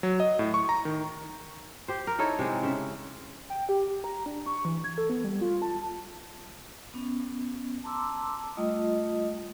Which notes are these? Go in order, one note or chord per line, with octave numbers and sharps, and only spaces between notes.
F#3
D#5
A2
C#6
A#5
D#3
G4 C5
A#4
D#4 E4 A4 C#5
C3 G#3
C#3 E5
G5
G4
A#5
D4
C#6
E3
G#6
A4
B3
G3
F4
A5
B3 C#4
A5 A#5 C6 D6 E6
G3 A3 F4 D#5 D#6